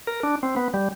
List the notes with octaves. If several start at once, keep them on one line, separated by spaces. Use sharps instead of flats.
A#4
D4
C4
B3
G3